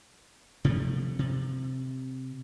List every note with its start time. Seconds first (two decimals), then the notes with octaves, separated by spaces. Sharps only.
0.65 C3 F3 A3
1.19 C3